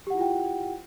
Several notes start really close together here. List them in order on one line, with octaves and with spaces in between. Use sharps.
G4 F#5 E4 F4 G5